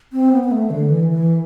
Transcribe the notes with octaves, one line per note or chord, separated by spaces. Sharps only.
C4
B3
B3
A3
D3
E3
E3